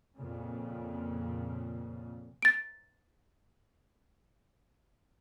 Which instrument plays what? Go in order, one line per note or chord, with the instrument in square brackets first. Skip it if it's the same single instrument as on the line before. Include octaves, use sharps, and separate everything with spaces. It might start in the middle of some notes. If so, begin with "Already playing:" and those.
[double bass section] F2 A#2 C#3
[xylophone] A6 D7